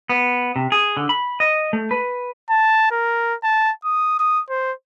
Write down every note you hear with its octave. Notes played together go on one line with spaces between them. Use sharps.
B3
C3
G#4
D3
B5
D#5
A3
B4
A5
A#4
A5
D#6
D#6
C5